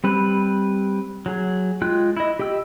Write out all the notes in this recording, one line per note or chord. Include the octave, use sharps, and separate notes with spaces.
G3 C4 B4
F#3 G#4
G#3 F4 G5 F#6
E4 D#5
G4 D#5 G5 E6